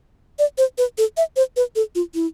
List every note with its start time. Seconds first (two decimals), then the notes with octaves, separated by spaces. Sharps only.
0.39 D5
0.58 C5
0.78 B4
0.98 A4
1.17 E5
1.36 C5
1.56 B4
1.75 A4
1.95 F4
2.14 E4